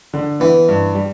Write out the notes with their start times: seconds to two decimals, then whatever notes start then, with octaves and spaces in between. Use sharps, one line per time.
0.13 D3
0.40 E3 B3
0.69 G2
0.95 G3